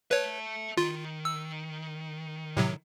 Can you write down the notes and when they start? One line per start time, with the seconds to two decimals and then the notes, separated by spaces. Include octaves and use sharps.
0.11 B4 C#5 E5 A5
0.78 D#3 F4
1.25 E6
2.57 A2 C3 F#3